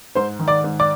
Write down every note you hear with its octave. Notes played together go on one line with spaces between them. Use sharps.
G#2 C5 C6
D#3
D5 D6
G#2
D5 D6